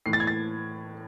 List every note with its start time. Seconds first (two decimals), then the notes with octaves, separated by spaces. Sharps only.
0.06 A2 E3 C7
0.13 A6
0.20 G#6
0.27 A6